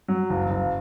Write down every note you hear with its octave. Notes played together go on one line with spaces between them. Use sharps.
F#3
F#1
F#1